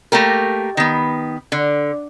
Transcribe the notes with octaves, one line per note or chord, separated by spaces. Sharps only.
A3 A#3 G4 A#4
D#3 B3
D3